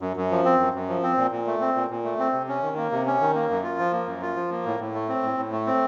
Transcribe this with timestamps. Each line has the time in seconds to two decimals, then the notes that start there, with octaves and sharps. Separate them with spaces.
0.01 F#2
0.17 F#2
0.31 F3
0.45 C4
0.59 F#2
0.74 F#2
0.89 F3
1.03 C4
1.17 A#2
1.32 A#2
1.47 A3
1.60 C4
1.75 A#2
1.91 A#2
2.04 A3
2.19 C4
2.33 C3
2.48 C#4
2.62 D#3
2.77 A#3
2.92 C3
3.06 C#4
3.21 D#3
3.35 A#3
3.50 F#2
3.63 F4
3.79 F3
3.93 A#3
4.07 F#2
4.22 F4
4.36 F3
4.51 A#3
4.65 A2
4.80 A2
4.94 A3
5.09 C4
5.23 A2
5.37 A2
5.52 A3
5.67 C4